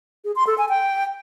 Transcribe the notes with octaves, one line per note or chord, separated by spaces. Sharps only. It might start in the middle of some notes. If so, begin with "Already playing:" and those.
G#4
C6
A4
G#5
G5